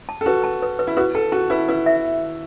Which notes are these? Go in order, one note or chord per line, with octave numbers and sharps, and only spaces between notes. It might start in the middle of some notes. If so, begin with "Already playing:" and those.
A5
A4
F#4 B4
A5
B4
B4
E4
F#4 B4
A4 A5
F#4 A5
E4 B4
E4 B4
E5